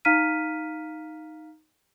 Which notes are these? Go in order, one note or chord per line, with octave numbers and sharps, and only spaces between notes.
D#4 F5 A#5 F6 B6 D#7